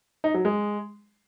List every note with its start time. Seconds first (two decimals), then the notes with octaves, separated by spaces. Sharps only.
0.24 D#4
0.34 F#3
0.45 G#3